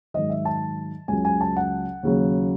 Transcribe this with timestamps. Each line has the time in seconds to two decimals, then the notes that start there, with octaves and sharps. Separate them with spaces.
0.14 G#2 D#3 F#3 D#5
0.30 E5
0.45 A5
1.08 C#2 C#3 F#3 G#5
1.25 G#5
1.41 A5
1.56 F#5
2.03 D#2 C#3 F#3